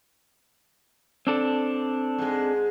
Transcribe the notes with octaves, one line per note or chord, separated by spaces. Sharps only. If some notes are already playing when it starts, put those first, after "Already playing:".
C4 D4 A4
G#2 G#3